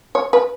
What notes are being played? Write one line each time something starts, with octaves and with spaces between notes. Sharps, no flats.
C#5
B4